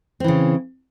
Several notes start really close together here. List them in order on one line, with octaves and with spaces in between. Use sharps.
C4 E3 C#3